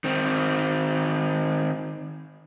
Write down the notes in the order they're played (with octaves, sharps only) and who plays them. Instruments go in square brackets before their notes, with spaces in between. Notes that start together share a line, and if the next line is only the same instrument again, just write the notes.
[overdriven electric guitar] D#3 C4